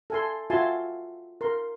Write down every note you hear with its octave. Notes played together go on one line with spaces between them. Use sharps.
A4 G#5 C6
F4 F#4 E5 G#5 A5 C6
A#4 C6